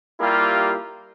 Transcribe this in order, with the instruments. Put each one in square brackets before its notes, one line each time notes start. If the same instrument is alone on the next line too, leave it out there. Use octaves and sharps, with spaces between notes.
[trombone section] G3 A#3 E4 F4 G4